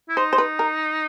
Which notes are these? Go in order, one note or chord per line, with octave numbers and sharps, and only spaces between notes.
E4
D#4 C5
C5
B4
A#4